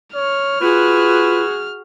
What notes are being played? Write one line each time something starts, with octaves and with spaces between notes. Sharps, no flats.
C#5 F6
F4 F#4 G#4 B4